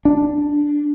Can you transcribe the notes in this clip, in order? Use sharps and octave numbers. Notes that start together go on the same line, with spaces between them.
D4